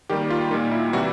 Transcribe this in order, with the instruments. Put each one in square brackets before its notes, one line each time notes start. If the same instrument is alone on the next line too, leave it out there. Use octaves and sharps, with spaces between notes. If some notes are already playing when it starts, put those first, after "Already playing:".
[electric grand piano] D#3 G3 A#3 G4
F4
A#2 G3 A#3 D#4
E4
C3 E3 G3 F#4